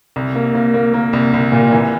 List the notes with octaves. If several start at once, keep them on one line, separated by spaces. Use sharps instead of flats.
C2
A#3
A#3
A#3
A#3
C2
C2
A#2
E3